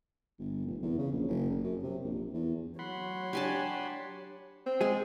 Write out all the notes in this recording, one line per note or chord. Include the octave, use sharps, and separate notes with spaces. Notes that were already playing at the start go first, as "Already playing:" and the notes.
G1
F1
E2
C#3
A#1
F#1
F#1
F#2
C3
A#1
E2
F#3 C#5 F#5 B5 C6
D4 G4 G#5 A5
C4
G#3 G#4